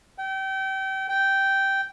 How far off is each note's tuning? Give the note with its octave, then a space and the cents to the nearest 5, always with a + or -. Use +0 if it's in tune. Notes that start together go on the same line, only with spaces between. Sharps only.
G5 -30
G5 -10